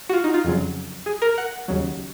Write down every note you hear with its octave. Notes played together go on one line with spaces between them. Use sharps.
F#4
F4
D#4
F4
F2 C#3 F#3
G#4
A#4
F#5
D#2 C#3 F#3